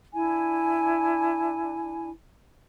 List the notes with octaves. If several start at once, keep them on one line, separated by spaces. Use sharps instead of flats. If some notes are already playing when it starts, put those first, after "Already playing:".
D4 E4 G#5